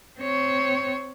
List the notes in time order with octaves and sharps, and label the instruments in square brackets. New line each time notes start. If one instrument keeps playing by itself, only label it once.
[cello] C4 C#5